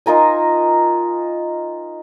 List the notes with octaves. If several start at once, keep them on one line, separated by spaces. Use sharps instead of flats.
D#4 F4 A#4 G#5